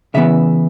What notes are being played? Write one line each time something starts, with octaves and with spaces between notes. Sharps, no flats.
C#3 E3 B3 E5